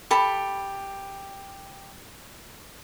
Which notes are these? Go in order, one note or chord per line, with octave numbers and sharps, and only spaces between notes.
G4 A4 B5